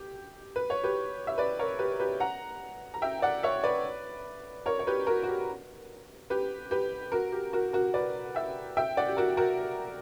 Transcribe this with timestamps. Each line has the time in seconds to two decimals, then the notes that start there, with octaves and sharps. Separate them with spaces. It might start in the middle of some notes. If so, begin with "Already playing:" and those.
Already playing: G4
0.56 B4
0.70 C#5
0.83 G4 B4
1.27 E5
1.38 B4 D5
1.59 A#4 C#5
1.79 G4 B4
2.00 G4 B4
2.20 F#5 A#5
2.94 A#5
3.02 E5 G5
3.19 G5
3.22 D5 F#5
3.43 C#5 E5
3.64 B4 D5
4.66 A#4 C#5
4.79 C#5
4.87 G4 B4
5.07 F#4 A#4
5.23 F#4
5.28 G4
6.30 G4 B4
6.71 G4 B4
7.12 F#4 A#4
7.32 G4
7.53 F#4 A#4
7.73 F#4 A#4
7.94 B4 D5
8.35 E5 G5
8.77 E5 G5
8.97 D5 F#5
9.08 G4
9.17 F#4 A#4
9.37 F#4 A#4